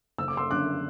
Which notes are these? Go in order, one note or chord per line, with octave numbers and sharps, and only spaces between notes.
F#1 E6
D6
C6 E6
F#2 D3 D6 F#6